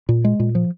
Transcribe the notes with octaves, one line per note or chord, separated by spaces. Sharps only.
A#2
G#3
A#2
F3